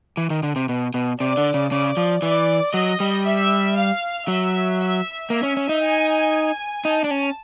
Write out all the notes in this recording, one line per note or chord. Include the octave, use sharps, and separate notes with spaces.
E3
D#3
D3
C3
B2
B2
C3 D5
D3
C#3
C#3 D5
F3
E3 D5
F#3 D#5
G3
E5
F5
F#3 E5
E5
A#3 E5
C#4
C#4
D#4
G#5
D#4 A5
D4
C#4